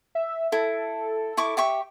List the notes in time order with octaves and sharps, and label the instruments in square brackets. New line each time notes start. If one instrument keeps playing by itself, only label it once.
[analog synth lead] E5
[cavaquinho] E4 [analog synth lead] A4
[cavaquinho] E4 C#6 D6
G4 E5 C#6